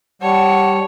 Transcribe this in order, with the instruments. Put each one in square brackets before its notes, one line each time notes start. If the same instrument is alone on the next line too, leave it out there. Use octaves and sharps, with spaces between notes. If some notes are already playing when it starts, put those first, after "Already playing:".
[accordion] G3 [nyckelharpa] C#5 A5 [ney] F#5